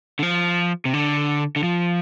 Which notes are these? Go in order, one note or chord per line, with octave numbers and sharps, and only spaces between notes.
D3
F3
C3
D3
D3
F3